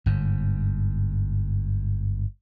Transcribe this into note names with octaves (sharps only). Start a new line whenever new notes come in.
G1 G#2